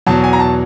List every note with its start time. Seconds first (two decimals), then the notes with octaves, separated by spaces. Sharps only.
0.06 E2 B2 F#3 A5
0.24 G#5
0.33 A#5
0.40 A5